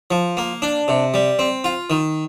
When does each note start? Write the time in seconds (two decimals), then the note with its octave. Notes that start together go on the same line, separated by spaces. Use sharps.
0.11 F3
0.37 A#3
0.62 D4
0.88 C3
1.14 G3
1.39 C4
1.64 F4
1.90 D#3